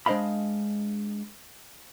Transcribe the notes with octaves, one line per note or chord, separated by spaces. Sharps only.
G#3 D4 C5 D#5 F5 B5